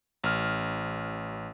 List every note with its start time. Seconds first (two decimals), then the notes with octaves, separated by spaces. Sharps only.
0.24 A1 F6